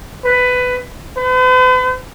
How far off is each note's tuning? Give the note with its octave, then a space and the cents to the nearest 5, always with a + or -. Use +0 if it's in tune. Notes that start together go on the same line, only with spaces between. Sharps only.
B4 +15
B4 +45